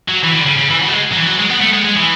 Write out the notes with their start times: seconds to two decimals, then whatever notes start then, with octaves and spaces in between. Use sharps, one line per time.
0.09 F#3
0.23 E3
0.35 D3
0.46 C#3
0.59 C#3
0.69 E3
0.82 F#3
0.88 A3
0.93 G#3
1.12 F#3
1.16 E3
1.27 F#3
1.39 G#3
1.50 B3
1.62 A3
1.74 G#3
1.85 G#3
1.97 E3